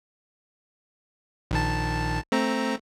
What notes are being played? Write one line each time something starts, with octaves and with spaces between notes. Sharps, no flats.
A#1 D#3 A5
A3 C4 A#5